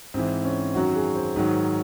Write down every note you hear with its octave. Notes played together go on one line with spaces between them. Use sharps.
G#2 E3 C4
C#4
F#2 D#3 F#3 F#4
G#4
C5
G#2 D#3 F#3